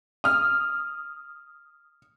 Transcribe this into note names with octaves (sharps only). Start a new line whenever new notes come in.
D#6 F6